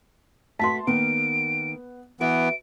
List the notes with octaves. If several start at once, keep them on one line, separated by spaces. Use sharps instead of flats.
A3 F#4 B4 A5 C6 B6
D#3 A#3 B3 D7
E3 B3 F#4 B4 E5 D7